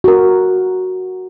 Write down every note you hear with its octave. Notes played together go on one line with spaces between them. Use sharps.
F#4 A#4